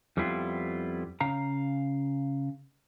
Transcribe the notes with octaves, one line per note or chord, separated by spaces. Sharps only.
F2 G3 B3 E4 F4
C#3 F5 A#5